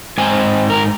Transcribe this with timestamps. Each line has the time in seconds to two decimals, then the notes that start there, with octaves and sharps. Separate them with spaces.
0.18 G#2 G#3 C4 D#4 G#5
0.70 A#4